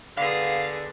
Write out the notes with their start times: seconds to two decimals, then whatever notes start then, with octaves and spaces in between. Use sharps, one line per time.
0.17 D3 B3 G#4 F5